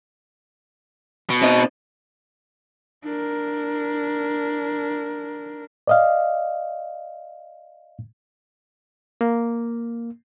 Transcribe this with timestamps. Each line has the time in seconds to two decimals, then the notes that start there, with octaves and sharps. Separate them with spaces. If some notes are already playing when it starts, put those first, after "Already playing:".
1.30 B2
1.42 C4 D#4 D#5
3.04 D4 A#4
5.87 D5 D#5 F5
9.21 A#3